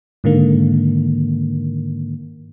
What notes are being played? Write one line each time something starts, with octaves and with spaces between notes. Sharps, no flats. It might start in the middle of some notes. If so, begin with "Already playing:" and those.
G#2 D3 D#3 A#3